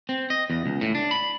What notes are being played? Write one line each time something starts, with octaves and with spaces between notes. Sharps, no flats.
C4
D#5
E2
C#2
A2
D4
B5